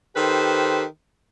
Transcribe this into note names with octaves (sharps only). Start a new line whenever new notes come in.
D#3 G4 A4 B4 C5